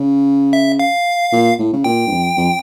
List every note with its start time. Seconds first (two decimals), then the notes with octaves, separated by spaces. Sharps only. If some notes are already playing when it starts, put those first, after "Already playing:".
Already playing: C#3
0.53 E5
0.79 F5
1.32 A#2
1.59 A2
1.73 C#3
1.84 A#2 G5
2.07 G2
2.11 F2
2.37 F2